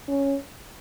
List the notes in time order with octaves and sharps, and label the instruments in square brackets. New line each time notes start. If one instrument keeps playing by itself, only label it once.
[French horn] C#4